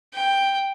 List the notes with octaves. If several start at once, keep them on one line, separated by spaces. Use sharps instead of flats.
G5